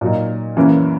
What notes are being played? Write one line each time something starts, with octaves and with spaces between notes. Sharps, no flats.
A#2 F#3 A#3 D#4
F#2 C#3 E3 A#3 C#4